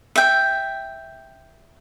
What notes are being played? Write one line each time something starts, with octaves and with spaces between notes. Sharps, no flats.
E5 G5